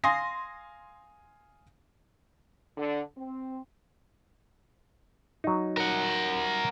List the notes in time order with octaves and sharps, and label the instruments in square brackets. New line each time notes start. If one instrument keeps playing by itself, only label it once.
[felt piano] F5 G#5 D#6 [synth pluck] C6 A#6
[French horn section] D3
C4
[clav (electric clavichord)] F#3 D#4
[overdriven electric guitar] A#4 F#5